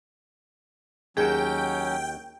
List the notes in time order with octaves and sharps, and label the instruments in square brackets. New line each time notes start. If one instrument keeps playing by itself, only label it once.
[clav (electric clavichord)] D#2 F#4 [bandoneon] F#3 C#4 [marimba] G#4 [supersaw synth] G5